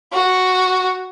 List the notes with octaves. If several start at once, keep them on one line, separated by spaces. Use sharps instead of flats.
F#4